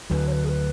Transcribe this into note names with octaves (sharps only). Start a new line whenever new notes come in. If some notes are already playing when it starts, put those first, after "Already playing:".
D2 D3 F#3 B4
C#5
B4
G#4
B4